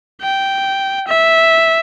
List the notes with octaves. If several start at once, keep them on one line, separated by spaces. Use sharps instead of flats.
G5
E5